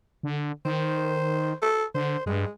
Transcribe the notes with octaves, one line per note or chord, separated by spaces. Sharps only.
D3
D#3 C5
A4
D3 C5
G2 G#3